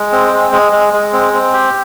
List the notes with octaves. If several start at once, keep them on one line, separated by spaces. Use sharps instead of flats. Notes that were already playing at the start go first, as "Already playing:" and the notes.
Already playing: G#3
C4
G#3
G#3
G#3
G#3
C4
C4
G4